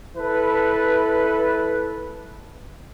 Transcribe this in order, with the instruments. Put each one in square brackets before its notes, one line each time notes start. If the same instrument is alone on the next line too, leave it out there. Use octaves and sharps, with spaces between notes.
[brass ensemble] E4 A4 B4